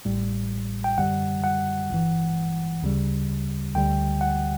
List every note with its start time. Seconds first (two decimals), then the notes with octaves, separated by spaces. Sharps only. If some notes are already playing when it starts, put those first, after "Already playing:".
0.05 A1 A2 G3
0.84 G5
0.97 F#2 D3 G3 F#5
1.44 F#5
1.90 G1 G2 E3
2.82 D2 C#3 G3
3.75 D2 D3 G3 G5
4.21 F#5